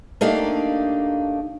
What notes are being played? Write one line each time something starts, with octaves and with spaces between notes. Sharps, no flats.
A3 A#3 D4 D#4 G4 F5